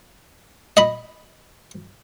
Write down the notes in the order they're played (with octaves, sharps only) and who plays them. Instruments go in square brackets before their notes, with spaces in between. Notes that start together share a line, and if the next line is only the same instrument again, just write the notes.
[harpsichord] D#5 B5